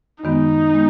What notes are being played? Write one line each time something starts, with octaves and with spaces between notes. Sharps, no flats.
F#2 D#3 G#3 B3 D#4
G#3 B3